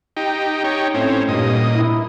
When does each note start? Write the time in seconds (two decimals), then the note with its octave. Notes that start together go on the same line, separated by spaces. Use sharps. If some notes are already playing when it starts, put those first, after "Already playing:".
0.17 D#4 G4
0.64 D#4 G4 C#5
0.94 A2 C4 C#4
1.28 G2 A#2 D#5
1.75 E4